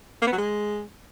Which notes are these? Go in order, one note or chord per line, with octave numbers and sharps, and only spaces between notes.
A#3
B3
F#3
G#3